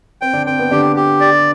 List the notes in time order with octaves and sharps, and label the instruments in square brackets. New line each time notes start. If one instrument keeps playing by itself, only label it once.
[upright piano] C4 [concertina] G5
[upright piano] D3 D4
[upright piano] C4 [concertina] G5
[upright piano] B3
[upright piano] D3 D4 [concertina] G4
[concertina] G4
D5